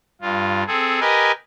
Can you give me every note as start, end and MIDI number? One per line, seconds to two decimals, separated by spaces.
0.21 0.64 43
0.21 0.64 65
0.67 1.00 60
0.67 1.00 68
0.67 1.00 69
1.01 1.32 67
1.01 1.32 70
1.01 1.32 71
1.01 1.32 75
1.01 1.32 80